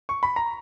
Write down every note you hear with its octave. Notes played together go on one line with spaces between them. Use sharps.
C#6
B5
A#5